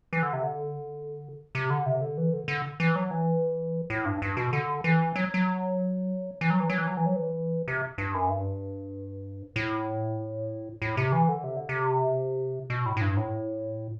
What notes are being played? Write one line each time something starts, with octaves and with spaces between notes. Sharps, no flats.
E3
D3
C3
D3
C3
D3
C3
D3
E3
D3
D3
E3
F#3
E3
A2
G2
G2
B2
D3
E3
F#3
F#3
E3
F#3
E3
F#3
E3
F#3
E3
F#3
E3
C3
G2
F#2
G2
A2
A2
C3
E3
D3
C3
D3
C3
B2
A2
A2
G2
A2